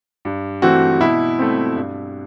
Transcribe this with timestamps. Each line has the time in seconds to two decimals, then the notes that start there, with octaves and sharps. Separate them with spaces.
0.25 G2
0.62 E3 A3 C4 F#4
1.01 B2 E4
1.39 A3 C4
1.76 G2